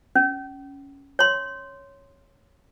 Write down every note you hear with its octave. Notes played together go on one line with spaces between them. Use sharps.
C#4
C#5 C6